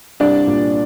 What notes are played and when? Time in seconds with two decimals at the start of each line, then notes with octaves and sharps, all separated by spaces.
0.20 C2 D4 D5
0.47 A#2